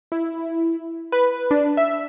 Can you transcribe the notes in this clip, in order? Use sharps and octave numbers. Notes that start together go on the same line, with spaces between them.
E4
B4
D4
E5